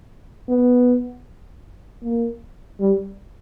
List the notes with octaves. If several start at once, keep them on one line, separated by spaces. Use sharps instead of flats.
B3
A#3
G3